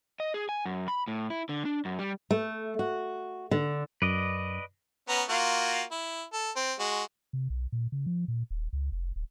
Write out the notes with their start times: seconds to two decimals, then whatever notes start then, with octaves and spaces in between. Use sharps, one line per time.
0.20 D#5
0.34 G#4
0.49 G#5
0.66 F#2
0.88 B5
1.08 A2
1.30 E4
1.49 D3
1.65 D4
1.85 F#2
1.99 G3
2.31 A3
2.79 F#4
3.51 D3
4.02 F#2 B4 D5 D#5
5.09 B3 C#4 A#5
5.29 A#3 F4 F#4
5.92 E4
6.33 A4
6.56 C4
6.79 G#3 F#4
7.33 C3
7.50 B1
7.72 A#2
7.92 C#3
8.06 F3
8.28 A#2
8.50 D#1
8.73 C#2
8.92 F1
9.16 D1